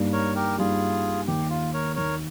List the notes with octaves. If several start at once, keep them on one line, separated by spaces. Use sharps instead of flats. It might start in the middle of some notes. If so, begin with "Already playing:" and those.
Already playing: G2 G3 A#3 D#4
A#4 C#5
G4 A#4
G2 G3 A#3 D#4 F4 G#4
D#2 D#3 A#3 G4
F4
A#4 C#5
D#2 D#3 A#3 A#4 C#5